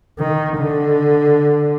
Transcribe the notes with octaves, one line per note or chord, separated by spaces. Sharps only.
D#3
D3